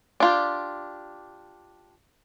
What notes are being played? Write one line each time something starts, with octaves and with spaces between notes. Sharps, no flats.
D4 F4 G4